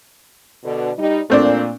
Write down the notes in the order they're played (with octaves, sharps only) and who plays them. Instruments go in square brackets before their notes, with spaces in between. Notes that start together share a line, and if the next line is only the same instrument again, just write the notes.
[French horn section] B2 D3
G3 D#4
[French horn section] A#2 [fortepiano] A3 C4 D4